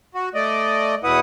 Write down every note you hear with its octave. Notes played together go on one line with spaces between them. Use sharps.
F#4
A3 D5 D#5
E2 B2 E4 B4 F#5 D#6